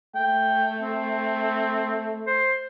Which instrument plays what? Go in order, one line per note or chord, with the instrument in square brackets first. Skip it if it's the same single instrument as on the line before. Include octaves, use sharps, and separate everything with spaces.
[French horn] A3 [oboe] G5
[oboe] C4
C5